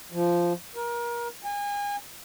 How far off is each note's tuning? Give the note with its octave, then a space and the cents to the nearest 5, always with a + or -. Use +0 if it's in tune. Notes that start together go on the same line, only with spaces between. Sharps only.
F3 -10
A#4 +30
G#5 -35